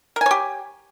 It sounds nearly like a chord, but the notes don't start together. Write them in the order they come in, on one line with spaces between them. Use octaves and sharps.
A#4 G#5 C#5 G4